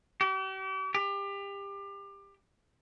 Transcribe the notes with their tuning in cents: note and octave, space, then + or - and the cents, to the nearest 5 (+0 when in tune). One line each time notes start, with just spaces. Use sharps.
G4 -40
G4 +25